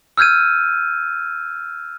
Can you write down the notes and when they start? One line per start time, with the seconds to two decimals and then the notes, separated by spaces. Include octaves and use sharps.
0.18 E6 F6 G6 G#6 D#7